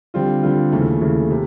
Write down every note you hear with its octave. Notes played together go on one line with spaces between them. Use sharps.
D3 G3 C4 F4
D3 G3 C4 F4
D#2 C#3 E3 A3
D#2 C#3 E3 A3
C3